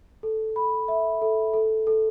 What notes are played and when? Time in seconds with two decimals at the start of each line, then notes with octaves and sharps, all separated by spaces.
0.23 A4
0.56 B5
0.88 E5
1.22 A4
1.54 A4
1.87 A4